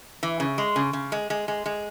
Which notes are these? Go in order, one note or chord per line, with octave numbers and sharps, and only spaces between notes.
E3
C#3
G#3
C#3
C#3
G#3
G#3
G#3
G#3